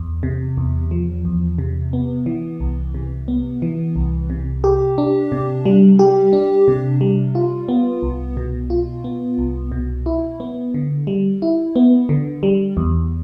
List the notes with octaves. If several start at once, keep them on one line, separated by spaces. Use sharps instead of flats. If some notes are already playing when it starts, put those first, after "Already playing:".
Already playing: E2
C3
E2
F3
E2
C3
B3
E3
C2
C3
B3
E3
C2
C3
G4
D4
C3
G3
G4
D4
C3
G3
F4
B3
C2
B2
F4
B3
C2
B2
E4
B3
D3
G3
E4
B3
D3
G3
E2